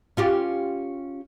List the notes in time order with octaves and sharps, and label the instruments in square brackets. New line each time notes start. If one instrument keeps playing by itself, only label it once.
[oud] C#4 F4 G4